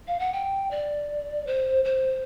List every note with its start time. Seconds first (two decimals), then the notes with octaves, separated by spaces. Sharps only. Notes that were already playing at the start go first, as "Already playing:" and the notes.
0.08 F5
0.19 F#5
0.33 G5
0.71 D5
1.47 C5
1.85 C5